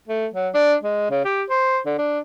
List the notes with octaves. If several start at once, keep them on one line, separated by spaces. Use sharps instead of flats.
A3
F#3
D4
G#3
C#3
G4
C5
D3
D4